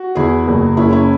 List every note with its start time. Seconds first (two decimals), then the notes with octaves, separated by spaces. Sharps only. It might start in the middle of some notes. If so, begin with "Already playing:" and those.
Already playing: F#4
0.15 E2 E4 G#4
0.47 F#1
0.77 F#1 C#4 E4
0.92 C#4 E4